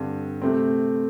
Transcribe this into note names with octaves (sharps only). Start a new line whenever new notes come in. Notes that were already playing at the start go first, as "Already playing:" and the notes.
Already playing: G2 D3 C4
C3 A3 C4